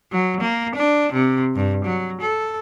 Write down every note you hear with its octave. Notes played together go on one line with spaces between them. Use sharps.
F#3
A#3
D4
C3
G2
F#3
A4